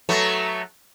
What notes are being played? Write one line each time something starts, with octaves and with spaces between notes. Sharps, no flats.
F#3 A3 B3